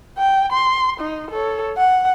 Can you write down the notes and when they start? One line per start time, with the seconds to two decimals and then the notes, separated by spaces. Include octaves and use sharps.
0.18 G5
0.52 C6
1.00 D#4
1.31 A4 C#5
1.77 F#5